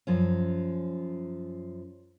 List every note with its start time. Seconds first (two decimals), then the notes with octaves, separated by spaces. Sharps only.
0.07 F#2 F3 C#4